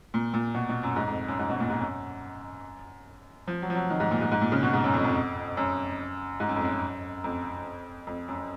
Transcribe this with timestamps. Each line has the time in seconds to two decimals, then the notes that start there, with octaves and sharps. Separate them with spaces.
0.14 A#2
0.34 A#2
0.55 B2
0.69 B2
0.83 F#2
0.96 G#2
1.08 F2
1.28 F#2
1.39 G#2
1.50 B2
1.60 A#2
1.70 G#2
1.80 F#2
3.47 F3
3.62 F#3
3.70 F3
3.75 F#3
3.90 D#3
4.00 G#2
4.11 A#2
4.21 G#2
4.32 G#2
4.41 A#2
4.52 C#3
4.63 B2
4.73 G#2
4.84 F#2
4.94 F2
5.05 F2
5.57 F#2
6.40 G#2
6.49 F#2
6.56 F2
6.64 F#2
7.24 F2
8.07 F2
8.28 F#2